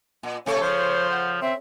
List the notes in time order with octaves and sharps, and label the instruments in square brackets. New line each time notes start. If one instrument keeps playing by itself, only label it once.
[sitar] A#2
[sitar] C3 A3 A4 [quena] C#5
[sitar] C#3 [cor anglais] F3 [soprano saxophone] C5
[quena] F#5
[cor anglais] C4 [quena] E5